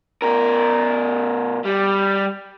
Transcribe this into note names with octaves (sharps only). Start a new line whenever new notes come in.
B2 A#4
G3